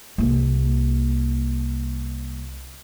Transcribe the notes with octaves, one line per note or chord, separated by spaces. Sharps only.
C2 A#3